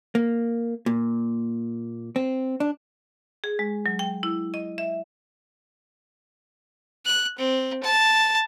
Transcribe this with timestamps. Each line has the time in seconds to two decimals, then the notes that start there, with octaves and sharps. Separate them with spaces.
0.15 A#3
0.86 A#2
2.16 C4
2.60 D4
3.44 G#4
3.59 G#3
3.86 F#3
3.99 G5
4.23 E4
4.54 D#5
4.78 E5
7.06 F#6
7.38 C4
7.83 A5